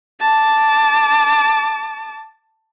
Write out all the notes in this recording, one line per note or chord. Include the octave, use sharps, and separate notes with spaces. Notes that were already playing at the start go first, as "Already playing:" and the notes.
A5 D6